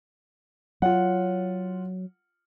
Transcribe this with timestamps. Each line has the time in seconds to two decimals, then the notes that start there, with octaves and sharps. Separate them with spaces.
0.82 F#3 F4 F#5